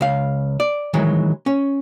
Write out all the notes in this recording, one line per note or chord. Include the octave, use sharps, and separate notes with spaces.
C#2 F5
D5
D#3 E3 F#3 G#3
C#4